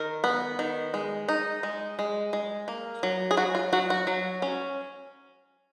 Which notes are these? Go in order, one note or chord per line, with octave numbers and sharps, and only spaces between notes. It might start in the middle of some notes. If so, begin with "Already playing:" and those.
Already playing: D#3 A#4
B3
D#3
G#3
D#4
G#3
G#3
G#3
A#3
F#3
G#4
F#3 F#4
F4
F#3 F#4
F#4
F#3
C#4